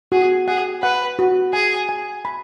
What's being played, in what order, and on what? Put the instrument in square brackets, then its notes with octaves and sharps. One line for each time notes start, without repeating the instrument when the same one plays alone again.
[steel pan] F#4 [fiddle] G#4
[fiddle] G#4 [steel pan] F#5
[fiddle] B4 [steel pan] F#5
[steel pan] F#4
[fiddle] G#4 [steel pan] G#5
[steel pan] G#5
B5